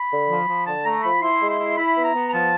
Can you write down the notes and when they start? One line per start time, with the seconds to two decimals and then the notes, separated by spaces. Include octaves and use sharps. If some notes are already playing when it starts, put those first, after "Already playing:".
Already playing: B5
0.11 D3
0.29 F3
0.48 F3
0.66 D3 A5
0.85 A3 A#5
1.03 F3 B5
1.22 E4 C6
1.40 G#3
1.50 C6
1.59 E4
1.77 E4 B5
1.96 B3
2.04 A#5
2.14 B3
2.29 A#5
2.33 F3 A5